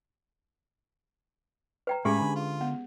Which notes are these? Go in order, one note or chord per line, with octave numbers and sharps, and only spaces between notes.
B4 G5 A#5
A2 G#3 C#4 G4 G#4 G#5 B5
D3
F4
B3